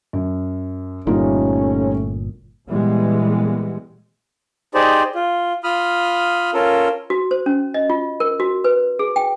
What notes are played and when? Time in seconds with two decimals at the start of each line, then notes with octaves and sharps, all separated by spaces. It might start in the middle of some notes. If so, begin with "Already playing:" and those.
0.13 F#2
1.07 G1 A#2 G3 A3 C#4 D#4 F4
2.67 A#2 E3 G3 G#3 B3
4.74 D#4 G4 G#4 C5 D5
5.15 F4
5.64 F4 B5 D#6 F6
6.54 C#4 F4 A4 A#4
7.10 F#4
7.31 C5
7.46 C#4
7.74 D#5
7.90 F4
8.20 A#4
8.40 F#4
8.64 B4
8.99 G#4
9.16 G5